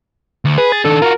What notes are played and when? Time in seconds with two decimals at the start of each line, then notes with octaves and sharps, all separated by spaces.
0.45 D2
0.58 G#4 B4
0.72 A6
0.85 D#3 D4 A4
1.02 F4 F#4 A#4